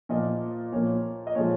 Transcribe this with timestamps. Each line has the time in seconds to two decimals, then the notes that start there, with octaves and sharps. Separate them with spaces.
0.09 A#2 F3 A#3 D#5
0.72 A#2 F3 A#3 C#5
1.27 D#5
1.35 A#2 F3 G#3 C#5